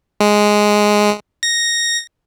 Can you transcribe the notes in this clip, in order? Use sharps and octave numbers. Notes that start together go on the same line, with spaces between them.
G#3
A#6